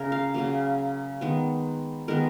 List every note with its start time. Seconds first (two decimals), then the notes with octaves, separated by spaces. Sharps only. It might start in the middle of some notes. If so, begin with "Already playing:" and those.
Already playing: C#3 A#4
0.12 F5
0.34 C#3 F#3 A#3 F5
1.21 D#3 G#3 B3
2.08 D#3 G#3 B3 A#4